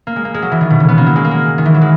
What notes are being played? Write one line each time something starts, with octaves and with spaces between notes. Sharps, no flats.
A#3
G#3
A#3
G#3
F#3
E3
D#3
B2
C#3
B3
A#3
F#3
G#3
A#3
G#3
D#3
E3
F#3
G#3